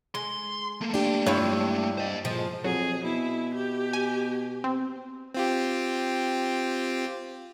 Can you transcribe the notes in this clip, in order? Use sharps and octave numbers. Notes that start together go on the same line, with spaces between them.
G#3 C6
A3 A#3
D4 G4
G2 E4 F4 C#5
C5 D#5
A#2 F3 G#3
F2 F#3 G#4
B2 E4
G4
G#5
C4
C4 F4 G4